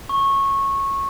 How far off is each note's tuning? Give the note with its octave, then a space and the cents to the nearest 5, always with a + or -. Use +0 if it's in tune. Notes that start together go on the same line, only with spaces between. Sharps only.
C#6 -15